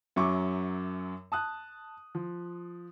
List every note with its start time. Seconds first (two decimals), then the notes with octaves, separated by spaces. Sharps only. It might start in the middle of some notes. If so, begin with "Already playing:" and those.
0.16 F#2 F#3 E5 C#6 D6
1.32 A5 D#6 F#6
2.15 F3